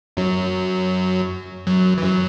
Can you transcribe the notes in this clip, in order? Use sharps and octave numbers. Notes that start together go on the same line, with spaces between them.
F#2 F#3
F#2 F#3
E3
F#2 F#3